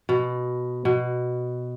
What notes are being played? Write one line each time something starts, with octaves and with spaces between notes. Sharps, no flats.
B2
B2